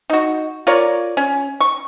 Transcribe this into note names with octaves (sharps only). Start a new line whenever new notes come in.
D#4 F#4
F4 A#4 C#5 D5
C#4
C#6